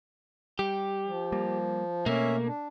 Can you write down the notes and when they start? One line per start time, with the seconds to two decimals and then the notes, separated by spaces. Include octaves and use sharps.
0.59 G3 G4
1.06 F3
1.32 G3 A#3
2.06 B2 A3 A#3 C#4 E5
2.46 D4